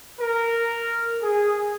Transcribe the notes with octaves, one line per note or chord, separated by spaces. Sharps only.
A#4
G#4